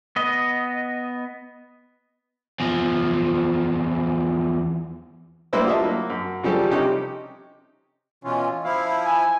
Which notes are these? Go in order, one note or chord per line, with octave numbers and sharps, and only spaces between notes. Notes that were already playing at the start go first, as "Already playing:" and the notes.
B3 D#5
E2 F3
G3 A#3 E4 B4 C5 E6
F4 D#5 E5 A5
F#3 A#3
F#2
C#3 F3 G3 G4 A4
C3 C#4 D#4 G4
B2 E3 C#4 F4
F3 E4 F5
G#5